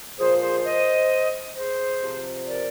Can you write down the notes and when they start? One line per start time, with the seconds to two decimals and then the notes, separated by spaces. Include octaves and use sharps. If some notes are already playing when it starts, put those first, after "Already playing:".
0.19 A#2 F3 G#4 C5
0.41 G#4 C5
0.64 C5 D#5
1.56 G#4 C5
2.02 C3 F3
2.48 A#4 D5